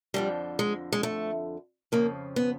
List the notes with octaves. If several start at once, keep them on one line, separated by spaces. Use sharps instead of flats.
F2 D3 F3 G3
G#3
G#3
A3
F2 C#3 F3 A#3
B3